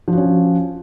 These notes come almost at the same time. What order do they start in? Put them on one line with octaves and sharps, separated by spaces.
F3 F#4 C#4